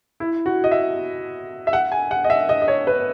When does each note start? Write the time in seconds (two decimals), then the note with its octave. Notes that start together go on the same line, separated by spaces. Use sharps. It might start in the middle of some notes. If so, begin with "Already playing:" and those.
0.20 E4
0.46 F#4
0.64 D#5
0.71 E5
1.67 E5
1.73 F#5
1.92 G#5
2.11 F#5
2.24 D#5
2.30 E5
2.49 D#5
2.62 D#5
2.68 C#5
2.87 B4